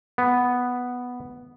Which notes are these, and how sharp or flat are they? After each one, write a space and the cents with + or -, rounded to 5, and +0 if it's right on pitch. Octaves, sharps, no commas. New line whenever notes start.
B3 +0